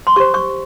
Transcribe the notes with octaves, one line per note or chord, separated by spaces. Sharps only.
C6
G4 C5 C#6
C#6